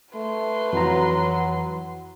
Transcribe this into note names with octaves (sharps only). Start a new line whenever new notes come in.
A3 B4 C6
F2 E3 F#3 A#5